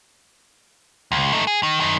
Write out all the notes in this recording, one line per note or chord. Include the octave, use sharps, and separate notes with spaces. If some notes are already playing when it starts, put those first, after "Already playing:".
C#2
A3 D#4
G#4
D#3
F#2 D#3